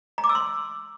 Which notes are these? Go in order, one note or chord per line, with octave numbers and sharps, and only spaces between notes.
A#5
D6
E6
C6